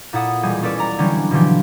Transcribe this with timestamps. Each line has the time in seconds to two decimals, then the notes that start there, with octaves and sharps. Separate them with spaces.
0.13 A#2 E4 A4 F#5 D#6
0.43 E1 G3 G#4
0.62 C#4 A4 B4 D5
0.78 D5 A#5
0.98 D3 E3 F#3 G3 C#4 D4
1.31 B2 D3 E3 F3 G4